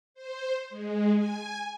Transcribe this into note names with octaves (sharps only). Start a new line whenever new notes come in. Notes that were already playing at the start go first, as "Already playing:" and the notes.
C5
G#3
G#5